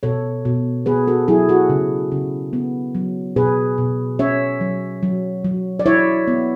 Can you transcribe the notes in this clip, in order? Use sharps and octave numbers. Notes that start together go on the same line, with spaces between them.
B2 A4 C#5
B2
B3 G#4 B4
F#4 A4
F#3 E4 G#4
F#4 A4
C#3
C#3
B3
F#3
B2 G#4 B4
B2
C#4 C#5 E5
F#3
F#3
F#3
D5
E4 C#5 E5
B3